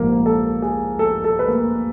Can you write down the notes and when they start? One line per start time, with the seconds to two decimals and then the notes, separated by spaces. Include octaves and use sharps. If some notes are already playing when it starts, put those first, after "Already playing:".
Already playing: A#1 G#2 F3 A#3 A#4
0.26 A4
0.62 G#4
0.99 A4
1.24 A4
1.39 B4
1.48 A#3 A#4